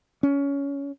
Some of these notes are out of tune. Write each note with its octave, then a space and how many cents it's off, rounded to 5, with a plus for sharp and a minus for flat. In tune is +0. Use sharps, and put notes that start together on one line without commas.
C#4 +20